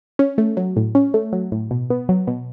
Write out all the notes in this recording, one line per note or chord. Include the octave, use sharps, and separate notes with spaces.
C#4
A3
F#3
A2
C#4
A3
F#3
A2
B2
B3
F#3
B2